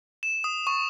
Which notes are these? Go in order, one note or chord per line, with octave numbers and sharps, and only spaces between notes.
E7
D#6
C#6